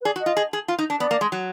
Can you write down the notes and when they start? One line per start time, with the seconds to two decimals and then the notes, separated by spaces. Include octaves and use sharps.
0.01 B4
0.05 G#4 D5
0.16 F#4
0.21 D#5
0.26 F4
0.37 G#4
0.53 G#4
0.68 F4
0.79 D#4
0.90 D4
1.00 B3 D5
1.11 A#3
1.21 G#3
1.32 F#3